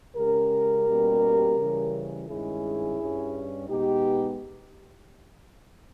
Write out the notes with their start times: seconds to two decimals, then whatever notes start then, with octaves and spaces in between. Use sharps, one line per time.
0.16 C#3 G#3 C#4 G4 A#4
0.86 B2 G3 A#3 C#4
1.57 C#3 E3 G3 C#4
2.27 G2 D#3 G#3 C#4 E4 G#4
2.97 G2 G3 C#4
3.69 B2 G#3 B3 D#4 G4